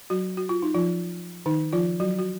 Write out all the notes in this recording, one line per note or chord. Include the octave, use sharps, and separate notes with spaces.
F#3 F#4
F#4
F4
D#4
F3 F4
D#3 D#4
F3 F4
F#3 F#4
F#4